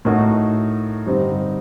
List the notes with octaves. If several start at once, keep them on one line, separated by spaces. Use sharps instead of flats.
A2 A3 D#4 F#4 A#4
G2 D3 G3 C4 D#4